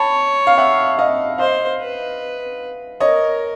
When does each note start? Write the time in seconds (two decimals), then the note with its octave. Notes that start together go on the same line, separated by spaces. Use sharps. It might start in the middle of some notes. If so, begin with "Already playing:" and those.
Already playing: C#5 A5 B5
0.47 F5
0.58 E5 F#5
0.99 D#5 F5
1.38 C5 D#5 F5
1.80 B4
3.00 A#4 C#5 D#5